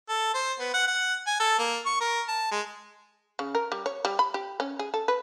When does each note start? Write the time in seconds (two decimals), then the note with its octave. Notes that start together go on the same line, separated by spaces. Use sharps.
0.09 A4
0.34 C5
0.59 B3
0.74 F#5
0.87 F#5
1.26 G#5
1.40 A4
1.59 A#3
1.85 C#6
2.00 A#4
2.28 A5
2.51 G#3
3.39 C#3
3.55 A#4
3.72 G3
3.86 C#5
4.05 G3
4.19 B5
4.34 G4
4.60 C#4
4.79 G#4
4.94 A4
5.08 B4